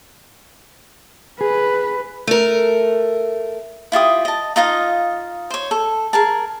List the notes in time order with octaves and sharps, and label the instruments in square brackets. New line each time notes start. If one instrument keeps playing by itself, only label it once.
[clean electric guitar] G#4 [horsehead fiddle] B4
[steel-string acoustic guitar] A3 A#4
[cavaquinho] E4 F4 G4 D#6
D#5 A5
D#4 F4 D#5 F5
C5 C#5
A4
G#4 A#4 A5